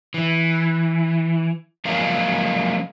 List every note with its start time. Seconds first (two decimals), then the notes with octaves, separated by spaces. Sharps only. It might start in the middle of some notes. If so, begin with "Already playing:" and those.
0.14 E3
1.85 F3 F#3 G#3 A#3 C#4 F5